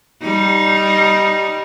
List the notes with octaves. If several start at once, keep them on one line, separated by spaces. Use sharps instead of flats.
G3 D#4